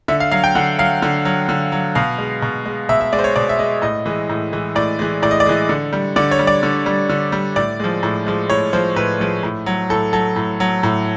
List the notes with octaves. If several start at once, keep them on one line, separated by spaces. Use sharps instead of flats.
D3 E5
F5
F#3 F5
G5
D3 F#5
F#3 F5
D3
F#3
D3
F#3
B2 F5
G#3
B2
G#3
B2 E5
E5
G#3 D5
C5
C#5
B2 D5
E5
G#3 D#5
A2 D#5
E3 G#3
A2
E3 G#3
A2 D5
E3 G#3
A2 D5
D#5
D5
E3 G#3
D3
G3
D3 D5
C#5
G3
D5
D3
G3
D3
G3
A2 D5
F3 G#3
A2
F3 G#3
A2 C#5
F3 G#3 C5
A2 B4
F3 G#3
A2
F#3
A2 A4
F#3 A4
A2
F#3
A2